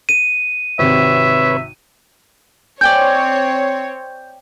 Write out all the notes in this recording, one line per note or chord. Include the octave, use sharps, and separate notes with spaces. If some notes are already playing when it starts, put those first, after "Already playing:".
D#7
G#1 C3 B4 C#5 E5
C4 C#5 D5 G5 G#5 G6